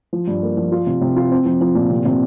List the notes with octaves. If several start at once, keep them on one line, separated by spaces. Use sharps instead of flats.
F3
G2
A#3
F3
F4
C3
C3
F4
C4
F3
F3
A#2
C3
C3